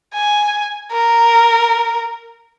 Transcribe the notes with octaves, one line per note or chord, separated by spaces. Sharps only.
G#5
A#4